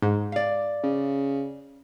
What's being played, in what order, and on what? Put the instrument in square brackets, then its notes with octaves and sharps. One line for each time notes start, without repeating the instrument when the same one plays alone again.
[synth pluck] G#2
[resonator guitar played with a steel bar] D5 F5
[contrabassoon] C#3